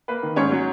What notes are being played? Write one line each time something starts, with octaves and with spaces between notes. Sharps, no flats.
A#3 B4
D#3
G#2 C#4 C#5
F#3